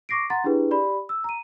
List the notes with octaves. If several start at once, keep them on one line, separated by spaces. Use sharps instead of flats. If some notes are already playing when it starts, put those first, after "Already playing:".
C#6 D6 A#6 C7 D7
F#5 A#5 C6 A6
D4 E4 G4 G#4 B4
G4 D5 B5
E6
A#5 D#7